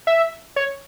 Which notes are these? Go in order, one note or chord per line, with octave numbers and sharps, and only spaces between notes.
E5
C#5